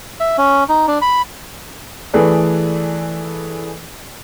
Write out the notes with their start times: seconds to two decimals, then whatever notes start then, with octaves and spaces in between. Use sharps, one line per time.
0.20 E5
0.38 C#4
0.69 D#4
0.88 D4
1.02 B5
2.14 E3 A3 G#4 A4 B4 D5